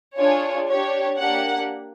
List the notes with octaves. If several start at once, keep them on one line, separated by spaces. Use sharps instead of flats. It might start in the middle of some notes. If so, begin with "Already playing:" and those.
D4 F4 G#4 C#5
D4 G4 C#5
A#3 D4 G4 F#5